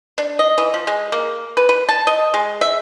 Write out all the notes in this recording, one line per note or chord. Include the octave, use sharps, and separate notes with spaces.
D4
D#5
E3
F3
G#3
A#3
B4
B4
A5
D#5
G#3
E5